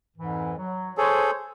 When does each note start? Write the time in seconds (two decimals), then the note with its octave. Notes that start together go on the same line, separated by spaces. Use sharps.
0.17 F2 G#2 E3
0.58 F#3
0.98 G#4 A4 C5 C#5